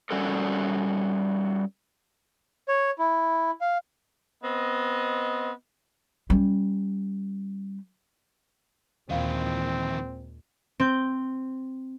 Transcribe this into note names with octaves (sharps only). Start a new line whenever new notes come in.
G3 C#4 F#4 A4 A#4
C#5
E4
F5
B3 C4 D#5
G3 C#4
D#2 A#2 D#3 E3 G#3 C4 F5
C4 G6